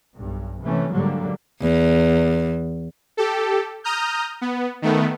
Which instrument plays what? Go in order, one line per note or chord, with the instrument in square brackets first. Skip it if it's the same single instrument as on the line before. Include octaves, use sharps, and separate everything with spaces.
[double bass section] B1 G2
C3 E3 A3 C#4
G#2 D3 F#3 G3 A#3
[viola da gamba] E2
[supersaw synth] G4 A4
A#5 D#6 F6 G6
B3
D#3 A3 B3